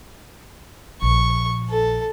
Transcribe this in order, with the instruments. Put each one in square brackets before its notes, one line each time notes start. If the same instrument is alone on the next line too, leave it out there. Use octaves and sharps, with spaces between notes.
[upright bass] A#1 [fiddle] C#6
[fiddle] A4